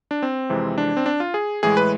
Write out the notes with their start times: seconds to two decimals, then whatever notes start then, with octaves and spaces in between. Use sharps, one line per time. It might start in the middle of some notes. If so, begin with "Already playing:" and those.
0.11 D4
0.22 C4
0.50 F2 C3 E3 G#3
0.78 D4
0.97 C4
1.06 D4
1.20 F4
1.34 G#4
1.63 A2 E3 G#3 G#4
1.77 B4